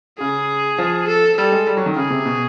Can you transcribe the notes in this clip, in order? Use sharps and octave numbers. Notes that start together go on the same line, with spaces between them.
C#3 G#4
F3
A4
G3 A4
G#3
G3
F#3
D#3
C#3 G#4
C3
B2